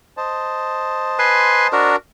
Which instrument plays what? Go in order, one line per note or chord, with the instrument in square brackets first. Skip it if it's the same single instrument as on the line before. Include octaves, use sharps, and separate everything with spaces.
[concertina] C5 D#5 A5
[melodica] B4 G#5 C6
D4 F#4 A#4